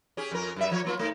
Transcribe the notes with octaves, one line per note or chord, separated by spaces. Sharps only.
C#4 G4 G#4
F2 C#4 A#4
F#2 G3 E5
F3 C#5
F#3 A#3 F4
G#2 A3